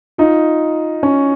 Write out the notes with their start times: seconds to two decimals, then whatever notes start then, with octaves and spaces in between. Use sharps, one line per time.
0.18 D#4 F4
1.03 C#4